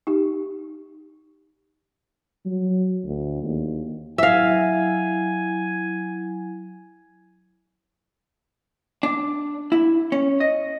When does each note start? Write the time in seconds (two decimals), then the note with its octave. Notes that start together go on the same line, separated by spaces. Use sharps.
0.07 D#4 G4
2.46 F#3
3.05 D2
3.44 D#2
4.18 F#3 E4 E5 F5 G#5
9.03 D4
9.72 E4
10.12 C#4
10.40 D#5